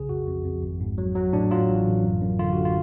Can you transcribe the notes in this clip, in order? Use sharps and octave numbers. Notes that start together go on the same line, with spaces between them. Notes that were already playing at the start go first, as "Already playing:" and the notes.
Already playing: B1 C#3 G#4
F2 F#4
F2
F2
G#1
G#2
F#3
F#3
A2 D4
F#3 F4
A1
A1
F#2
F#2
D3 F4
D3 F#4
F4